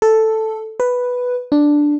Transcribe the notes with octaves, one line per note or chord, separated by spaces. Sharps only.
A4
B4
D4